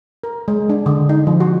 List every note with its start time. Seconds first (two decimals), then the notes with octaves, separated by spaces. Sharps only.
0.24 A#4
0.48 G#3
0.70 D4
0.86 D3
1.09 D#4
1.27 F3
1.40 F#4